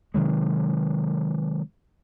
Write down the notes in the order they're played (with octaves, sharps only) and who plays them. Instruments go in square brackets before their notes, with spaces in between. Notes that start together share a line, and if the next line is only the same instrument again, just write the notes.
[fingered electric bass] C3 D#3 F#3 G#3